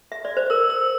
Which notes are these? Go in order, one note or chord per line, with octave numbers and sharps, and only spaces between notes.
E5
D5
C5
A#4 E6
E6